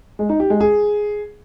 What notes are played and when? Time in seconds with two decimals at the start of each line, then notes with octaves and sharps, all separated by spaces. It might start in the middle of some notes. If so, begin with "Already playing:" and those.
0.19 G#3
0.29 D#4
0.40 G4
0.50 G#3
0.60 G#4